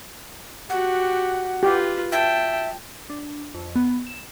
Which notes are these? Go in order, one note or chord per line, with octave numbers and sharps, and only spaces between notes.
F#4 G4 F#5
F4 G4 B4
E5 G5 A5
D4
F2
B3
E7